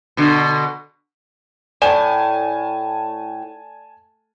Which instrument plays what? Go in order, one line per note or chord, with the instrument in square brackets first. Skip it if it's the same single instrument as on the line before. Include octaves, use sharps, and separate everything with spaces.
[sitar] B2 D3
[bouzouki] A2 [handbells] D5 [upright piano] G#5 A5